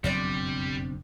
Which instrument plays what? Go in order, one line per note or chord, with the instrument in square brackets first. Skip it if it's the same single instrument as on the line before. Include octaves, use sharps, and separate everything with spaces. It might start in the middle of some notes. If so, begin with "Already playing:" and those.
[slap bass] F#1 B1 F2 [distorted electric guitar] G3 [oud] C4 D4 D5